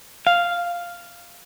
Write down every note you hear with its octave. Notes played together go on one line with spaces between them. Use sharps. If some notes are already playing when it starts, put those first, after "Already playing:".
F5